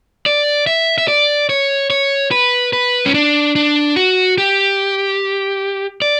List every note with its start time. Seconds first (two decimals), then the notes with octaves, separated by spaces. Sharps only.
0.26 D5
0.67 E5
0.98 E5
1.08 D5
1.49 C#5
1.90 C#5
2.31 B4
2.73 B4
3.06 C#4
3.14 D4
3.56 D4
3.96 F#4
4.38 G4
6.02 D5